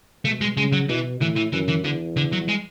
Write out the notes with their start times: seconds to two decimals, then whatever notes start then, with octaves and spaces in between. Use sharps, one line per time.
0.25 B2 A3
0.41 G#3
0.57 C#3 G#3
0.73 F#3
0.89 B2 E3
1.21 A2 E3
1.36 E3
1.53 F#2 E3
1.69 E3
1.84 E2 D3
2.17 D3
2.32 F#3
2.48 G#3